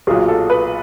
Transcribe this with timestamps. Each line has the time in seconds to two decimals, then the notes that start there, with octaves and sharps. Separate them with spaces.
0.07 B1 A#2 F#3 G#4
0.28 A4
0.50 B4